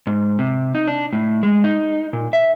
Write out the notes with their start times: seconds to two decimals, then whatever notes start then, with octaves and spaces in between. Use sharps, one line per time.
0.07 G#2
0.39 C3
0.75 D#4
0.88 D4
1.13 A2
1.43 G#3
1.64 D#4
2.13 A#2
2.33 E5